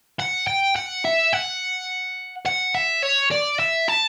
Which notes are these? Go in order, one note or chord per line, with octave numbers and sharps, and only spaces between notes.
F#5
G5
F#5
E5
F#5
F#5
E5
C#5
D5
E5
A5